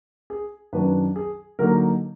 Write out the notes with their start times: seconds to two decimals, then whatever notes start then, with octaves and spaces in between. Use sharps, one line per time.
0.30 G#4
0.73 F#2 D#3 F#3 D4 B4
1.16 G#4
1.59 D3 F#3 A#3 D#4 A#4